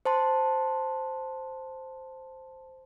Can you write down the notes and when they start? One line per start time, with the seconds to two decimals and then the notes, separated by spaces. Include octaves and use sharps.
0.05 C5 A5 C6